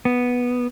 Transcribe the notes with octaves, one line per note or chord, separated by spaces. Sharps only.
B3